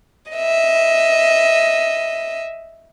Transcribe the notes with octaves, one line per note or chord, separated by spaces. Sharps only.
D#5 E5